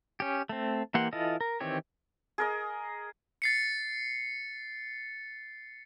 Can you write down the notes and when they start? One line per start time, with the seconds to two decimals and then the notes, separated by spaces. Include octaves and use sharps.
0.20 C#4 G4
0.49 A3 C4
0.94 E3 A#3 G4 F#5 C6
1.13 E3 E4 F4 A4 D#5
1.41 A#4
1.60 D#3 E3 C4 G4 C#5
2.38 G#4 A#4 D#5
3.42 A6 C7 C#7